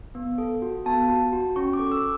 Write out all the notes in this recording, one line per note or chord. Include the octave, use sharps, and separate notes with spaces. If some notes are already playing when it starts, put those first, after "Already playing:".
B3
A4
F#4
B3 A5
F#4
F#4
C#4 C#6
D6
A4
E6